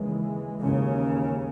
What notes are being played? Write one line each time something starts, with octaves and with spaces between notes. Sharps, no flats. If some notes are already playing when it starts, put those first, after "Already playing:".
Already playing: D#2 C#3 E3 G#3
D#2 C#3